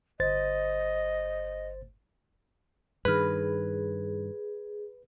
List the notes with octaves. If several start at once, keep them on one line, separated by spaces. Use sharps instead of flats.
G1 C5 D#5 A6
G2 D#3 G#4 B4 B5 F6